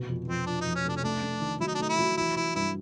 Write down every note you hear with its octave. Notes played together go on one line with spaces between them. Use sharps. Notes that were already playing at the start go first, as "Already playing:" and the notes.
Already playing: F1 B2
F2
F2 C4
F3 D4
F2 D#4
C#4
F1 D4
C#4
A3 D4
A3
D#3
F#3 E4
D#4
D4
A3 D#4
E4
F#3
E3 E4
E3 E4
G2 E4